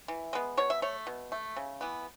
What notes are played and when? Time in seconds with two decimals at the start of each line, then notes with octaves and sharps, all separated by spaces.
0.08 E3
0.33 G#3 B3
0.57 B2 C#5
0.70 E5
0.82 A3 C#5
1.07 B2
1.32 A3
1.57 C#3
1.81 E3 B3